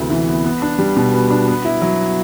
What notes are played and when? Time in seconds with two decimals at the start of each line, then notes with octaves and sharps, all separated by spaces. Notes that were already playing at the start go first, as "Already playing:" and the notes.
Already playing: D2 C3 E3 B3
0.10 E3
0.28 B3
0.45 B3
0.62 D4
0.79 G3
0.96 B2
1.13 B3
1.30 D4
1.48 B3
1.65 E4
1.82 F#3